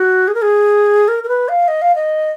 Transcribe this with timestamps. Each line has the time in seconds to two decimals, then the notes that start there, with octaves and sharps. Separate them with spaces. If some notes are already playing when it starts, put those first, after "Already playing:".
Already playing: F#4
0.28 G#4
0.35 A#4
0.42 G#4
1.08 A#4
1.24 A#4
1.29 B4
1.49 F5
1.68 D#5
1.82 F5
1.95 D#5